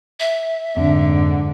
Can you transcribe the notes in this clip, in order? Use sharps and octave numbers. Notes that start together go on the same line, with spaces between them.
E5
F2 G#2 D3 C4